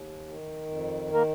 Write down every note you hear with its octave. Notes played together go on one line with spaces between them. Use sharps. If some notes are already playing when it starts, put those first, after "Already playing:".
Already playing: D#2
D#3
F2
A#3 A#4